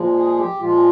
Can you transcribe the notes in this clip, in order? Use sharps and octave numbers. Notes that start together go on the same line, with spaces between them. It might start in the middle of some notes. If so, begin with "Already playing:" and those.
Already playing: A#2 F3 G#3
G#4
G4
A#2 F3 G#3 F4